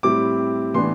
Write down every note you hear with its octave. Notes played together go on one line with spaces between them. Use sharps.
A2 G3 C4 E4 D6
A2 E3 B3 D4 C6